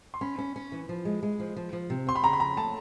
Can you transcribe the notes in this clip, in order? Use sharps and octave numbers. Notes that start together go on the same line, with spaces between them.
C6
C#4 B5
C#4
C#4
E3
F3
G#3
G#3
F3
F3
F3
C3
C4 C6
B5
C#3 A#5
B5
F2 A#5
A3 A5